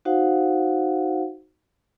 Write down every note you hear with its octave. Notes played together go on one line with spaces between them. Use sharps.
D#4 F#4 C5 F5 F#5